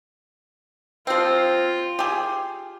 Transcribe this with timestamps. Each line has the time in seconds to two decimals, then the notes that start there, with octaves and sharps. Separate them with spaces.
1.07 F3 C4 F4
1.99 G4 G#4